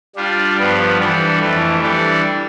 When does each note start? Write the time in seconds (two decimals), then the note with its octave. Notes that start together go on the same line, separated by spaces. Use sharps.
0.16 G3 D4 F4
0.56 G2 F3 B3
0.98 E3 G3 D4 A4
1.40 F2 E3 A3
1.80 E3 G3 D4 A4